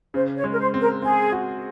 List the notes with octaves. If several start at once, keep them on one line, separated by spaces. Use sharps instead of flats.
C#3 C5
C#5
G#3
A#4
C5
C4
A#4
C4 G#4
F#4